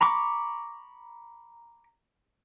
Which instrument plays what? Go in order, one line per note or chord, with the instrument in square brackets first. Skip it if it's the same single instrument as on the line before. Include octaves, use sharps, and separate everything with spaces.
[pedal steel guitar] A#5 B5 C#6 D6